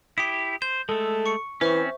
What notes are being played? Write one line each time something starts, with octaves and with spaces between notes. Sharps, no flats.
E4 G4 D#6 B6
C5 G6
G#3 A3 A4
C#6 C#7
E3 C4 C#4 C5 E5 C#6